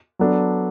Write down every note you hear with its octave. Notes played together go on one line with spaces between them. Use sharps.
F#3 B3 D4 A4